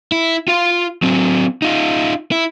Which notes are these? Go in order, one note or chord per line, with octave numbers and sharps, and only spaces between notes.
E4
F4 F5
F#3 C4
D#4 F4
E4